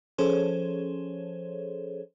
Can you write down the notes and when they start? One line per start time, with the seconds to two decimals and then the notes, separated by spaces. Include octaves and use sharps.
0.18 F3 C#4 G#4 A4 C5 C#5